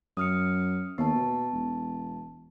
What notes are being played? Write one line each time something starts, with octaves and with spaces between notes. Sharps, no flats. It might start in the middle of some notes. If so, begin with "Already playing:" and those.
F#2 D#6 F6 C#7
D#2 B3 A5
B2
E1